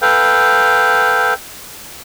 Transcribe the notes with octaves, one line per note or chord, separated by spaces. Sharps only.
A4 B4 F5 G5